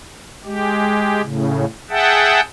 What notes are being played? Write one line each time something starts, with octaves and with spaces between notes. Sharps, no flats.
G#3 G4
A2 C#3
G#4 E5 F#5 G5 A5